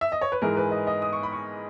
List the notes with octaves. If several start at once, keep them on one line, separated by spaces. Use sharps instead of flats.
E5
D#5
C#5
B4
G#2 E3 G#3 A#4
B4
D#5
D#5
D#6
C#6
B5
C#6